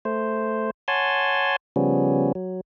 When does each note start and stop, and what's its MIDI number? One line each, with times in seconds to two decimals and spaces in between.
0.05 0.71 57
0.05 0.71 72
0.88 1.56 73
0.88 1.56 78
0.88 1.56 80
0.88 1.56 81
0.88 1.56 84
1.76 2.32 49
1.76 2.32 53
1.76 2.32 55
1.76 2.32 59
1.76 2.32 61
2.35 2.61 54